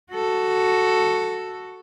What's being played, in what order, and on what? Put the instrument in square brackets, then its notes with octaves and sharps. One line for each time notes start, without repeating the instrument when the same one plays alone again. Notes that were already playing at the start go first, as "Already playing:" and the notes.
[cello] F#4 A4